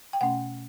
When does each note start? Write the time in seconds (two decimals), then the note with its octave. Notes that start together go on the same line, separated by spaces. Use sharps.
0.13 G5
0.21 B2 A3 C#4 F#5